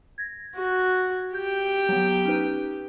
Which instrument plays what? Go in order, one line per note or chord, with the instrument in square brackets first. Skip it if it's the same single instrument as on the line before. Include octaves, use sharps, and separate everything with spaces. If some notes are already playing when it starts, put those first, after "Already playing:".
[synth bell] G#6 A#6
[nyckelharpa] F#4
[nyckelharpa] G4 G5 [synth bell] G6
[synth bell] F#3 B3
C#4 D#4 B4